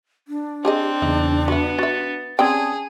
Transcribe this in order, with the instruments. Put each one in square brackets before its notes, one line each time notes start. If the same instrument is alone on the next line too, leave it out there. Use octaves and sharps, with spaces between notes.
[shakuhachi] D4
[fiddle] C4 [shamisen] G4 G#4 D#5
[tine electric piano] E2 C#3 [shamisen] D#4
[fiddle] B3 [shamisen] F#4 E5
[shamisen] F#4 E5 [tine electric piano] A6
[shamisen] C4 D5 G5 [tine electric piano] C#4 D#6 G#6 [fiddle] G#4 [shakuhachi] A5